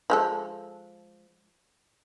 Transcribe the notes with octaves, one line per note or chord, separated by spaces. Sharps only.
F3 G#3 A4